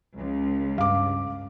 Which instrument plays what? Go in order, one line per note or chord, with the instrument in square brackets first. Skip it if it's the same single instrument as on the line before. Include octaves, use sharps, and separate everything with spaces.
[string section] C#2
[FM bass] G2 [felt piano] F5 D6